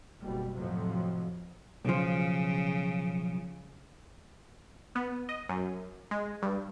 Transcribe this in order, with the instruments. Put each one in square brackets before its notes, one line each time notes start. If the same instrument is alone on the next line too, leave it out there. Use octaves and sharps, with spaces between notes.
[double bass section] F#1 B2 G3
F2 A2 C3 F3 F#3
[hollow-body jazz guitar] B1 F3 [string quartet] C#3
[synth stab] B3
D#5
F#2
G#3
G2